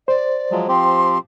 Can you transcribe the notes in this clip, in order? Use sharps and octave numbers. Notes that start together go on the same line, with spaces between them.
C5 D5
F3 F#3 G#3
F3 C4 G4 C6